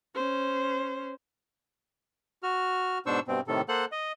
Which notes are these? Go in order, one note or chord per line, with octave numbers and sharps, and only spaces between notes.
C#4 C5
F#4 F6
G#2 B2 D4 C5 C#6 E6
G2 B2 C4
A2 C3 D#3 A4
A#3 A4 C5 F#5 F#6
D#5